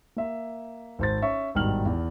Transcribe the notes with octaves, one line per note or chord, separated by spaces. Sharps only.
A#3 E5
G#1 C5 A6
C#4 E5 C#6
G#1 G2 B2 D#3 F6 F#7
E2